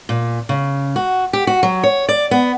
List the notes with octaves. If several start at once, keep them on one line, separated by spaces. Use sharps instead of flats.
A#2
C#3
F#4
G4
F#4
F#3
C#5
D5
B3